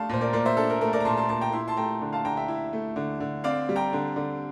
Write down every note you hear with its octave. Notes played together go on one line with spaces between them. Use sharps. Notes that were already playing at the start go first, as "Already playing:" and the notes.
Already playing: A3 D4 F5 A5 C6
A#2 C5
A#4 D5
A#2 A#4 D5
C5 E5
D4 A4
A#4
A3 A#4
A#4 D5
A#5
A#2 A5 C6
A5 C6
A#2 A5 C6
G5 A#5
E4 C6
A5 C6
A3 G5 A#5
D3
F5 A5
D3 G5 A#5
E5 G5
E4
A3
D3
D3
C4 D5 F5
G3
G5 A#5
D3
D3